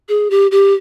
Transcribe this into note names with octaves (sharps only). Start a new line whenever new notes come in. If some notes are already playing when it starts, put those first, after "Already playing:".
G#4
G4
G4